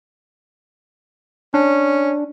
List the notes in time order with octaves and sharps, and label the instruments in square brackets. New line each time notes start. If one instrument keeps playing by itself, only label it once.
[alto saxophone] C#4 [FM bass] D4